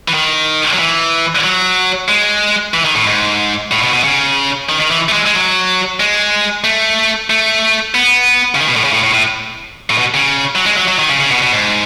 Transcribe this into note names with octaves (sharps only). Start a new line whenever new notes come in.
E3
D#3
F#3
E3
F#3
G#3
E3
D#3
A2
G#2
A2
B2
B2
C#3
D#3
D#3
E3
A3
G#3
G#3
F#3
G#3
A3
A3
B3
C#3
D#3
B2
A2
C#3
A2
A2
A2
A2
B2
C#3
F#3
G#3
F#3
F#3
D#3
C#3
C#3
B2
B2
G#2